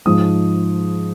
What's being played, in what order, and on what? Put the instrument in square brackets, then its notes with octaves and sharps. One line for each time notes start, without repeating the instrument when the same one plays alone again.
[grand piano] G#2 F3 D#6